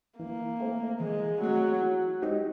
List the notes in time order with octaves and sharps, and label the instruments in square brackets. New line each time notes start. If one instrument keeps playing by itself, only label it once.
[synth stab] E3 [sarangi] A#3
[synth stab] A3 C4
[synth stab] E3 [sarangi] G#3
[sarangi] F#3 [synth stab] A3 C4
[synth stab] E3
G#3 C4 D#4 G4